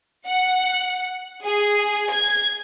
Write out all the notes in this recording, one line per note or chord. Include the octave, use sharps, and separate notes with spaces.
F#5
G#4
G#6